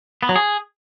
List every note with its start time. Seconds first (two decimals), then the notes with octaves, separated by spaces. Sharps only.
0.23 B3
0.29 F#3
0.36 G#4